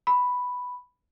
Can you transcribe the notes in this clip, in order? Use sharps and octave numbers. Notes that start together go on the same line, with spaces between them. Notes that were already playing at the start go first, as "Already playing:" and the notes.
B5